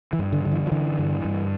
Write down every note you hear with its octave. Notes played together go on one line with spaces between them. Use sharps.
E3
G2
D3
D3
E3
F3
D3 E3
G2
G2